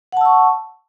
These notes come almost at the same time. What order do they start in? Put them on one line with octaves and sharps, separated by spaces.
F#5 A5 E6 C#6